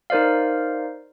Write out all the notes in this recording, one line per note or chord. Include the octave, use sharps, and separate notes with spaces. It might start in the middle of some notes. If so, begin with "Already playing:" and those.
D#4 A#4 C5 D5 F5